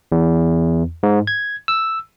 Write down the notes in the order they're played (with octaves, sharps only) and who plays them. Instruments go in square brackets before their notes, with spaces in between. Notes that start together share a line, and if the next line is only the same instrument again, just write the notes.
[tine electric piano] E2
G#2
G#6
E6